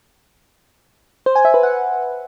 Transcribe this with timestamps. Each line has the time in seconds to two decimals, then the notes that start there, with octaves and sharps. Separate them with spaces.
1.26 C5
1.36 G#5
1.45 E5
1.54 B4
1.63 F#5